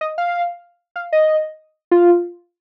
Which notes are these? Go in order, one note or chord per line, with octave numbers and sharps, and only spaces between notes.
D#5
F5
F5
D#5
F4